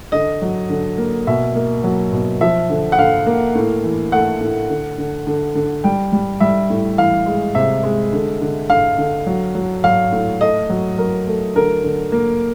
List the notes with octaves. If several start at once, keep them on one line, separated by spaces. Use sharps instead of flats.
D3 D#5
F#3
D3
A#3
B2 E5
A#3
F#3
B2
F3 E5
D3
F#5
D3 F5
A#3
A2
E3
A3 F#5
A2
D3
D3
D3
D3
G3 G5
G3
G3 E5
A2
E3 F5
G#3
C3 E5
G#3
D3
D3
D3 F5
D3
F#3
F#3
F#3 F5
A2
A3 D#5
F#3
F#3 A#4
A3
D3 A#4
D3
A#3